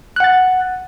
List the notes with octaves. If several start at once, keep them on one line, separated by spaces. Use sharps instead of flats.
F#5 F#6 A6